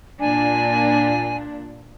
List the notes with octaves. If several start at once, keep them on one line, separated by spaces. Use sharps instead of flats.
A#2 D4 G#5